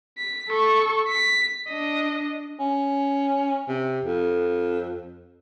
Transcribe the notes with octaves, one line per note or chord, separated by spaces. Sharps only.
B6
A4 C#6
B6
D4 D#5
C#4
C3
F2